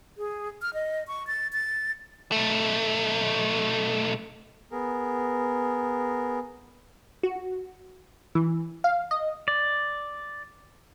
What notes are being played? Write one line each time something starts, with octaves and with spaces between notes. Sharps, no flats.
G#4
F6
D#5
C#6
A6
A6
B1 A3
B3 G#4 A#4
F#4
E3
F5
D#5
D5